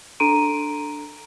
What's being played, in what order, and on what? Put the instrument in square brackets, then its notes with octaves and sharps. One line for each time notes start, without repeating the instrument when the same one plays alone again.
[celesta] D4 A4 A#5 C6 D7 D#7